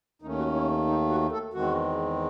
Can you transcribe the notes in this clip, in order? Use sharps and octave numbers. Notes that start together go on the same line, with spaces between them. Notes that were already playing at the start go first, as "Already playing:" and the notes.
D#2 D#3 A3 C#4 D#4
F#4
E4
C#4
D#4
F#4
A4
E2 D#3 G#3 C4 F#4